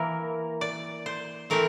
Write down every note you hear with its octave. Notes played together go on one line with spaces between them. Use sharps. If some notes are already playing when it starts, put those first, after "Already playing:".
Already playing: E3 A#3 E4 A#4
D5
C5
E3 A3 C4 E4 A#4